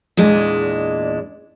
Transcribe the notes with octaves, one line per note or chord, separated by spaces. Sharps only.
E2 A#2 G#3 D4 D#5